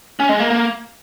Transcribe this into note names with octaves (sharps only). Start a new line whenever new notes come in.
C#4
G#3
A#3
A#3